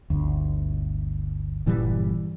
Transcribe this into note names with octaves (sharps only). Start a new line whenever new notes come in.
G1 D2
G1 A#2 E3 G3